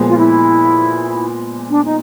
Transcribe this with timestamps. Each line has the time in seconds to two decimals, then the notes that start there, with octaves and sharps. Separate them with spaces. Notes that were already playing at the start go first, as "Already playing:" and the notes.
Already playing: A#2 F3 G#3 B3
0.08 F4
0.19 E4
1.70 D4
1.86 D#4